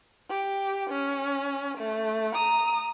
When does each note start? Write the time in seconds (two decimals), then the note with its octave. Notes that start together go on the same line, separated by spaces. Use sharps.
0.29 G4
0.90 C#4
1.78 A3
2.34 A#5 D#6